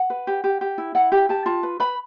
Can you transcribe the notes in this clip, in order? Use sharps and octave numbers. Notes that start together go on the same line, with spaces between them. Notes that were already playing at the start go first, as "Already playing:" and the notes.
Already playing: F#5
B4
G4
G4
G4
E4
E4 F#5
G4 G5
G4 A5
F4 A5
B4
B4 B5